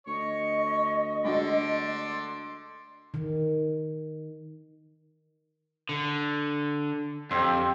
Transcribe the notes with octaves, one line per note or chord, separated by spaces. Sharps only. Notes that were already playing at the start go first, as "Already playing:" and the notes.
D2 C#5 D#5 C#6
D3 G#3 D4 F#4 D5 C6
D#3
D3
F2 C4 G4